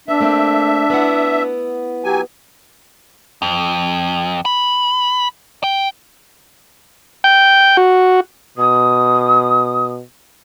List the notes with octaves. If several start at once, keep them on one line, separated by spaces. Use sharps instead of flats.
B3 D4 E5
A3 A#3 C4
B3 E4 F#5
F#3 G4 G#5
F2
B5
G5
G5
F#4
B2 D#6